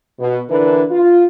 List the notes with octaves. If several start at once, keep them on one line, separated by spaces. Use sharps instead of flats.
B2
D3 E3 D4 E4 A#4 B4
F4